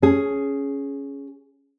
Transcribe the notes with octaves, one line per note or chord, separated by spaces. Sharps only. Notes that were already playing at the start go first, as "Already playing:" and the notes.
C#4 G#4